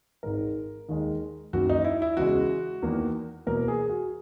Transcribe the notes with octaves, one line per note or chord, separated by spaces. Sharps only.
G#1 G#2 D#3 G#3 A#4
D#2 D#3 G#3
F#2 D#3 A#3 F#4
D#4
E4
E4
E2 C#3 G#3 F#4
E2 D#3 A#3
E2 B2 A#3 A#4
G#4
F#4